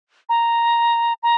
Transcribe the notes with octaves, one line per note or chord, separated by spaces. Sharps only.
A#5
A#5